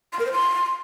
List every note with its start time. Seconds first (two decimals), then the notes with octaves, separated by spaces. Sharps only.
0.13 C6
0.19 A#4
0.26 C5
0.32 C6